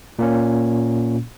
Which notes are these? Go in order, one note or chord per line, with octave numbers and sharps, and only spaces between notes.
A#2 A#3 C#4